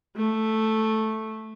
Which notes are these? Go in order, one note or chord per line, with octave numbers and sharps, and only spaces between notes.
A3